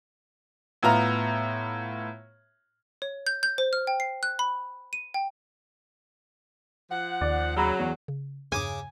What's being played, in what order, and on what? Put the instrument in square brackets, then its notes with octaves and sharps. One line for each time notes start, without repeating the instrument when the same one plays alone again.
[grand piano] A2 B3 F4 A#5 F6
[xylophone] C#5
G6
G6
C5
F6
G5
C7
F#6
B5
D#7
G5
[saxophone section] F3 F#5
[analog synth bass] D#2 [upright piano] D5
[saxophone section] C#3 F#3 [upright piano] A#5 B5 E6
[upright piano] E2
[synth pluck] C#3
[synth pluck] E2 G2 [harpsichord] C#3 D6 [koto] G#5